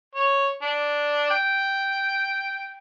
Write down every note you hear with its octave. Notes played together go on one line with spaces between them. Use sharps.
C#5
D4
G5